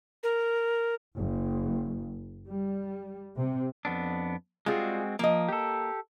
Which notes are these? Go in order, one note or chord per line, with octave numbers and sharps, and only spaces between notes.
A#4
F#1
G3
C3
F2 B3 D4
G3 G#3 C4 F4 F#4 G#4
F3 A#3 D#5
G4 A4